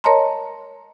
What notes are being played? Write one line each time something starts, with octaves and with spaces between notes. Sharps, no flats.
A#4 C#5 D#5 A5 A#5 C6